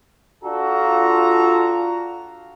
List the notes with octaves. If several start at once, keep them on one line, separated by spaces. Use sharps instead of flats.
D4 F4 F#4 A4 A#5